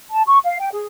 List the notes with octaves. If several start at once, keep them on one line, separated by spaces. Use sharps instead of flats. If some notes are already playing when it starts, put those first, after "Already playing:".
A5
C#6
F5
G5
G#4